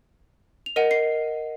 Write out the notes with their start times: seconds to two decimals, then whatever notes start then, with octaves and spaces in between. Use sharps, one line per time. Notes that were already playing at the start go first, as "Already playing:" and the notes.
0.66 F7
0.76 A#4 D#5 F#5 D#7
0.91 C7